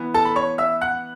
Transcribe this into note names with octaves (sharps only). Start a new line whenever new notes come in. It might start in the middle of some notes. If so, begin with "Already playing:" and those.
Already playing: E3 B3
A4 A5
B5
C#5 C#6
E5 E6
F#5 F#6